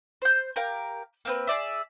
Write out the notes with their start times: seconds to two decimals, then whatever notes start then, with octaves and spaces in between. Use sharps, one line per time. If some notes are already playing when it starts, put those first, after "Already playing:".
0.22 C5 G6
0.56 G4 A#4 F5
1.25 A#3 C4 B4
1.47 G#4 B4 D5 E5